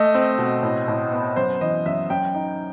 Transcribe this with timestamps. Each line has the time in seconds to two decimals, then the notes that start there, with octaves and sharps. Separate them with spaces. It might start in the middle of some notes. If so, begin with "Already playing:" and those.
Already playing: A3 D#5
0.14 C4
0.38 B2
0.63 A2
0.88 A2
1.12 B3
1.36 F#2 C5
1.61 E3 D#5
1.86 F#2 E5
2.10 F#2 G5
2.34 D#4